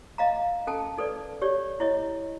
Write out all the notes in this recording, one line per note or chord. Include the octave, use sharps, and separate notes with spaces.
D#5 F5 A#5
C#4 A4 G5 A5
D#4 A4 B4 D5
G4 C#5 D5
E4 C#5 D#5